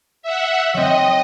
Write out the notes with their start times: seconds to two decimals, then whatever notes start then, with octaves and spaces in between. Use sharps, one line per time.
0.23 E5 F#5
0.74 F#3 C4 D#5